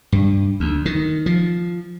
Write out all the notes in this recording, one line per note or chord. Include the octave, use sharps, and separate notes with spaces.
G2
D2
D#3
F3